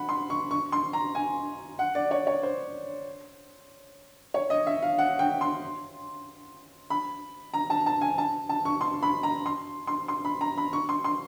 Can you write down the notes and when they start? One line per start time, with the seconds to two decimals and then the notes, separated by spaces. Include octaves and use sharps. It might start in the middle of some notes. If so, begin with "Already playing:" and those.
Already playing: F#5 B5
0.09 C6
0.30 C#6
0.51 C#6
0.72 C6
0.93 A#5
1.15 G#5
1.79 F#5
1.95 D5
2.11 C#5
2.27 C#5
2.43 C5
4.34 C#5
4.50 D#5
4.67 E5
4.82 F5
4.98 F#5
5.19 G5
5.41 C6
6.90 B5
7.54 A#5
7.70 A5
7.86 A5
8.01 G#5
8.18 A5
8.49 A5
8.65 C#6
8.81 C6
9.03 B5
9.23 A#5
9.46 C6
9.87 C6
10.08 C6
10.25 B5
10.41 A#5
10.57 B5
10.73 C#6
10.89 C6
11.04 C6